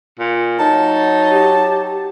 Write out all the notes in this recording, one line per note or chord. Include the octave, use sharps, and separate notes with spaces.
A#2
F#3 D#4 A5
G4